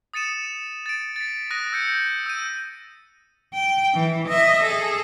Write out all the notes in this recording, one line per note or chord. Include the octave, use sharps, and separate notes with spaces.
D#6 A6 C#7 D#7 E7
A6 D7
A6 B6
D#6 F#6 A#6 D#7
E6 G6 C#7
E6 G6 D#7
G5
E3
D#5 E5
G#4 A4